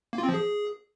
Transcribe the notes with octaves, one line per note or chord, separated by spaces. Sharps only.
A#3
F4
C4
F3
G#4